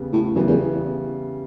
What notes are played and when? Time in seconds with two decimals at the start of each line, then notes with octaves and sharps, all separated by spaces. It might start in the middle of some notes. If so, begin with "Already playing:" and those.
Already playing: E2 C#3 G3 B3
0.13 A2
0.35 F#2 C#3 E3 G3 B3
0.48 E2